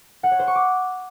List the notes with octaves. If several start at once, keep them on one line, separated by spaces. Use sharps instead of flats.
F#5
C#5
C5
C#6
D6